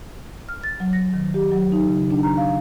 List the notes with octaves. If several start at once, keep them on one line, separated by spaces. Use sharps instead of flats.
F6
A6
F#3
A#6
D#3
G4
F#3
D#4
C#3
D4
A#5
F5